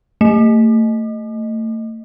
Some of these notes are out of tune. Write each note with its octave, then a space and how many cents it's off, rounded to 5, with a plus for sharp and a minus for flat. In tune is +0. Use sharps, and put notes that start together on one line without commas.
A3 +30